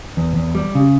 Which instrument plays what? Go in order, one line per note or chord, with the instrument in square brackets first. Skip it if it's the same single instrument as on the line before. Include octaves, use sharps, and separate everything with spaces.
[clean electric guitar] E2
E2
G3
C#3